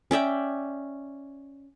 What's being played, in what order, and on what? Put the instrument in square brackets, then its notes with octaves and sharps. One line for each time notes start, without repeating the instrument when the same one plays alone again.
[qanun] C#4 D5 E5 G5